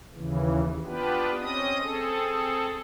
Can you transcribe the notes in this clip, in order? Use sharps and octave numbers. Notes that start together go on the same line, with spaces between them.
D#2 C#3 E3
B3 D4 F4 G4 B4
C4 C#4 D#5 D#6
C4 G#4 A4